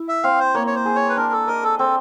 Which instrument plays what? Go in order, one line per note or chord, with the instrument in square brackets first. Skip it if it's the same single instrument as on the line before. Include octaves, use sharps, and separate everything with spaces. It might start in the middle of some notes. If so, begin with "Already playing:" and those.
Already playing: [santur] E4
[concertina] E5
[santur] C4 [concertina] F5
[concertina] C5
[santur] A#3 [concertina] C#5
[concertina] C#5
C5
[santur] G#4
[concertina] C#5
B4
[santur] D4 [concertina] A#4
[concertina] A4
[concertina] A#4 [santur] D#5
[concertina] A4
[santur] C4 [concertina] A4